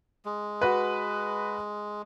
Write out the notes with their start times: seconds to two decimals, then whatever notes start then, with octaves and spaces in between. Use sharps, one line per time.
0.25 G#3
0.61 F#4 B4